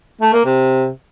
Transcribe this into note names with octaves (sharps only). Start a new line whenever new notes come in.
A3
A#3
C3